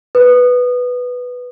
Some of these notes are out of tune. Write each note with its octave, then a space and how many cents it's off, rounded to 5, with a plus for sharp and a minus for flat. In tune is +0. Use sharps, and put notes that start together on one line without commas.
B4 +0 D#6 -25